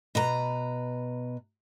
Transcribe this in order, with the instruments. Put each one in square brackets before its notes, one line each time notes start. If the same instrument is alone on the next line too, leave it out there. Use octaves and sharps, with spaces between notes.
[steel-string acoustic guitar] B2 B4 A#5